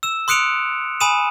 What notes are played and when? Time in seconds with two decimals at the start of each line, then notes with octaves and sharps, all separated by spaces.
0.03 E6 E7
0.28 C6 D#6 F#6 C#7 D7 F7
1.00 G#5 B5 D#6 D#7 E7